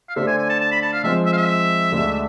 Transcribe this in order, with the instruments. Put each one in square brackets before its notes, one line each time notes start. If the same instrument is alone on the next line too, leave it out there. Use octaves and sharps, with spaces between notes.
[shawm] F5
[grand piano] D3 A3 D4 A4 C5 [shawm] E5
[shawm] G#5
G#5
A5
A5
B5
A5
F5
[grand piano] F3 G#3 C4 [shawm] E5
[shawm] E5
F5
E5
[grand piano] D2 D3 G#3 D4 A4